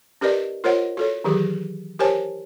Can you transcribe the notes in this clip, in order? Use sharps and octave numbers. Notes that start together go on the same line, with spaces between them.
C#4 G4 A#4 B4 D5 D#5
F4 A#4 C5 C#5 D#5 F#5
F#4 A4 C#5
D#3 E3 F#3 G4 G#4
G4 A#4 C5 C#5 G#5 A5